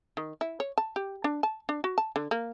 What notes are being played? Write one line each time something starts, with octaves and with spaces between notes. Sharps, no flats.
D#3
E4
C#5
A5
G4
D4
A5
D4
F#4
A5
D3
A#3